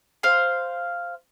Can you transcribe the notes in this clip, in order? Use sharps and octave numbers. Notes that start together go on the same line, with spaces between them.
C5 F5 C6